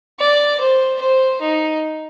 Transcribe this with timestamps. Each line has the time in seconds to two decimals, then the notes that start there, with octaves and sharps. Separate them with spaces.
0.19 D5
0.60 C5
1.01 C5
1.41 D#4